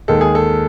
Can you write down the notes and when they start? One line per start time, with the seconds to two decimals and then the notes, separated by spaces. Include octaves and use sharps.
0.08 D#2 D#3 G#3 A4
0.21 G#4
0.35 A4